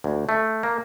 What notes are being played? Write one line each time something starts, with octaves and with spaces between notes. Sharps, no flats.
D2
A3
A#3